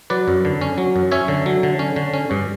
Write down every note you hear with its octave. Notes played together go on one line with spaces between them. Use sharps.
F#3 B4 D5
F#2
D3
C#4
F#3
F#2
C#4 C#5 E5
D3
F#3
D3
C#4
D3
C#4
G2